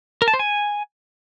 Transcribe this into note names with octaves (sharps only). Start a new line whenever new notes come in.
A#4
A5
C5
G#5